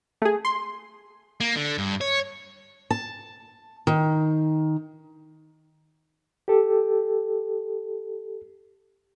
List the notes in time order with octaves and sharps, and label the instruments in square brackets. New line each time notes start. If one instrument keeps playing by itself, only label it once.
[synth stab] A3 G#4
C6
[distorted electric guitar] A#3
D3
G2
C#5
[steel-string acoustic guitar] A5
D#3
[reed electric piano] G4 A4